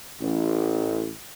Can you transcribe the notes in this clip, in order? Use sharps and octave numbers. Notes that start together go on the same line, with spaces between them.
A1